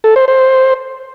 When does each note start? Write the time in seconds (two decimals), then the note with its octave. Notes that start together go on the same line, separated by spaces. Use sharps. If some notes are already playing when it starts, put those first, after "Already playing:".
0.04 A4
0.16 C5
0.28 C5